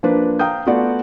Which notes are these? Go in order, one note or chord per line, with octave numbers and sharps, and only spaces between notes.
F3 A#3 D4 B4
F5 G5 A#5 D#6 G6
A3 B3 F4 F#4 D5